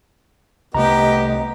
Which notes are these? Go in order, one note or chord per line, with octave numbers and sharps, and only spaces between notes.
C2 A3 B3 G4 D#5 A#5